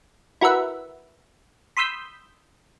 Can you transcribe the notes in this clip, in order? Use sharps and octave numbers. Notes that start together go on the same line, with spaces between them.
E4 F#4 A#4 B4 E5 F#5
B5 C6 D#6 E6 G6 B6